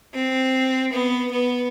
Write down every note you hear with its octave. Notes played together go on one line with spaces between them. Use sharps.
C4
B3
B3